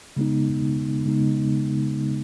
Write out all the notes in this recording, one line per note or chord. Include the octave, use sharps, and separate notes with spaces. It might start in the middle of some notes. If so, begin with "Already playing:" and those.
C#3 G#3 B3 D#4
C#3 G#3 B3 D#4